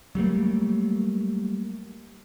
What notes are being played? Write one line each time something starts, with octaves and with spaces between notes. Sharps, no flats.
F#3 G3 A3 A#3